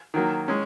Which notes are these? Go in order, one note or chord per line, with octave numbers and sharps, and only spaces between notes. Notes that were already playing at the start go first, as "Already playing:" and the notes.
D#3 F#3 A#3
G#3 C#4